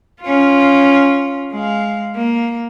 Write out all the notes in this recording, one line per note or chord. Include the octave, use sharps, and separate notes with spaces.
C#4 F4
G#3 F5
A#3